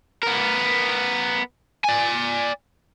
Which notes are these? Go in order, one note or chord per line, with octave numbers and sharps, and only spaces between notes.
B3 A#4
D5 G#5